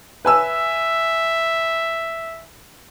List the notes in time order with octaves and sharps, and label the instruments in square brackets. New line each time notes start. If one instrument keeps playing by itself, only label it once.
[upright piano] B4 G#5 E6 [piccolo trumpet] E5